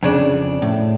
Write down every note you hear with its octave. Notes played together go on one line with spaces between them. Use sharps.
F2 C#3 D4
A2